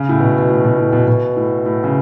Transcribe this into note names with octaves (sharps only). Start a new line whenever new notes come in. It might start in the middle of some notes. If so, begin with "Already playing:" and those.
Already playing: C#3
A2
B2
B2
A2
B2
A2
B2
B2
A2
A2
C#3